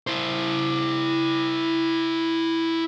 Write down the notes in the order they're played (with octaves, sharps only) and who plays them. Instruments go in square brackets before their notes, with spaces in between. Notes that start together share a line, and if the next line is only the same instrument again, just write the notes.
[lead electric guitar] E4 C5